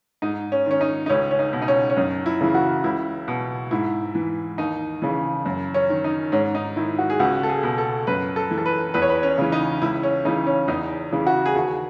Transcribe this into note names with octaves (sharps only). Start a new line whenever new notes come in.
G#2 D#4
C#4
D#3 C#4
D#4
D#4
C#2 C#4
C#4
D#4
B2
D#4
C#4
C#4
F#2 D#4
E4
C#3 E3
F#4
C#2 E4
B2
G#2 E4
E3
D#2 D#4
C#3 E3
F#2
C#4
D#3
D#4
G#2 C#4
D#4
D#3 E4
F#4
G#4
C#2 F#4
A4
G#4
B2
A4
F#2 B4
A4
E3
A4
B4
E2 B4
C#5
B4
C#4
C#3 E3
D#4
C#2 E4
C#4
C#3 E3 D#4
C#4
E2 D#4
C#3 E3
F#4
G#4
D#2 F#4